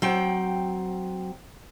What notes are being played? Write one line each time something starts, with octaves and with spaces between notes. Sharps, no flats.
F#3 C4 G5